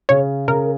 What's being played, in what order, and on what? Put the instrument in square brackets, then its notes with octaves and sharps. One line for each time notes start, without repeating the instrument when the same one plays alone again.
[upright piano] C#3 [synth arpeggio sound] C#5
[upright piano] C#3 [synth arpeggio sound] A#4